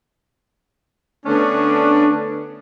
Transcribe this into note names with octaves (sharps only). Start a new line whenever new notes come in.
D3 A3 B3 C#4 D4